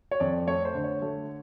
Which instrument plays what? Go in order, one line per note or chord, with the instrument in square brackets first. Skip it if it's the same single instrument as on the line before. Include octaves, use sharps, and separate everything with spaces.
[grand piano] C#5
F2 D5
A3 C#5
C5
D3
C#5
A3